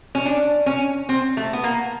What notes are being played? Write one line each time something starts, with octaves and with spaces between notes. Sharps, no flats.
C#4
D4
C#4
C4
A3
B3
A#3